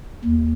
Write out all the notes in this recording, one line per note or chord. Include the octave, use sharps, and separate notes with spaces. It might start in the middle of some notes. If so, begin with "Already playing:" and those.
D#2